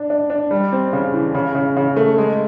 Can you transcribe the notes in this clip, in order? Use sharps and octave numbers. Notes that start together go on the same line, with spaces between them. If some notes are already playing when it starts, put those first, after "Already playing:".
Already playing: D4
D4
D4
G3
C4
C#3
E3
C#3
C#3
C#3
A3
G#3